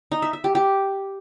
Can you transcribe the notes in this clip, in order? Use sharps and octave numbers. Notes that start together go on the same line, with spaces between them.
D#4
E5
E5
G4
G4